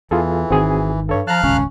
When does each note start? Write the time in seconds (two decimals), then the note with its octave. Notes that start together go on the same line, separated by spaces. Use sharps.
0.11 E2 E3 F4 G#4 A4
0.50 G#1 D#3 C4 F#4 G#4
1.09 G2 A4 C#5
1.27 F3 F5 A5 A#5 F6 F#6
1.44 D#1 G#1 C#2 C#4